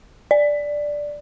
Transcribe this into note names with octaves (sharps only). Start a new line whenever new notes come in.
D5